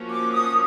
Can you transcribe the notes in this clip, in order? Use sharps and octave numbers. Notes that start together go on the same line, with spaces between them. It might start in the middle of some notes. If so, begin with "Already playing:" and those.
Already playing: F3 A#3 C#4 F#4
D6
D#6